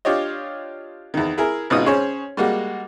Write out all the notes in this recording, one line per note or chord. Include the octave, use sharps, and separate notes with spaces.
D4 F4 G4 C#5 D#5
E2 D#3
E4 G#4 A#4
G#1 B2 C#4 D#4 F4 D#6
C#4 G#4 C5 C#5
G3 G#3 A#3 F#4